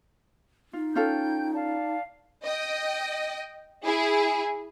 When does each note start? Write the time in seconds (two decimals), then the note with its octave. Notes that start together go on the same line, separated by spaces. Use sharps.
0.73 D#4 F4
0.95 C#4 F4 A4 G5 G6
1.54 D5 F5 A5
2.45 D#5 G5
3.85 E4 G#4